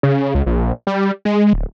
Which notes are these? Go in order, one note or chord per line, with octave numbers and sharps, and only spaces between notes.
C#3
C#2
A#1
G3
G#3
D1